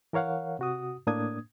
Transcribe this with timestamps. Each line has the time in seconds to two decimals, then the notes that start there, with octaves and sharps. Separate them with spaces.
0.13 E3 A#4 C#5 F5 F#5
0.59 C3 F#4 D#6
1.07 A2 A#3 D4 D#6 G#6